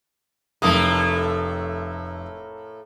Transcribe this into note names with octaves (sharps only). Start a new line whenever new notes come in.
F1 A2 A3 A#3 D#6